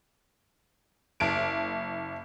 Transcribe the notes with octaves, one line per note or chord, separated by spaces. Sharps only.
F#1 D7